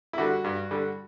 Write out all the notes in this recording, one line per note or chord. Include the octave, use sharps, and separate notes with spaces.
E4
D3 G3 F#4
G2
D3 G3